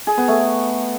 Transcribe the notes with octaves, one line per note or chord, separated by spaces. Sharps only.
G#4
B3
A3